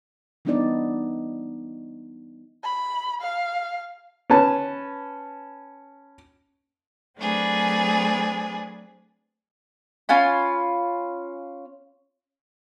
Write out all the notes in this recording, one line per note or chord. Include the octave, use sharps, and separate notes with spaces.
E3 G3 B3 D4 D#4 D5
B5
F5
C#4 B4 A5
F#3 A3 C4 D4 G#4 B4
C#4 F4 G#5 B5